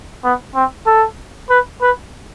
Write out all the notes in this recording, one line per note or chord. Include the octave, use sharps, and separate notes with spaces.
B3
C4
A4
B4
B4